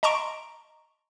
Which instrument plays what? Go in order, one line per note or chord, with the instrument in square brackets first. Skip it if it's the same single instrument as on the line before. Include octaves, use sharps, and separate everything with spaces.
[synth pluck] D#5 A5 A#5 C6 C#6 D7